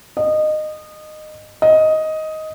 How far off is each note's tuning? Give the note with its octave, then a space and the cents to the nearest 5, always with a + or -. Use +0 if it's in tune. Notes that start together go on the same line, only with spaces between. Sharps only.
D#5 -20
D#5 +10